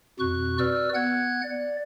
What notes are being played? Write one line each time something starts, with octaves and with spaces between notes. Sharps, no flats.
F2 B2 F#4 C#6 F#6
F#4 B4 D5 E6 F6
B3 F#5 F#6 G#6
D5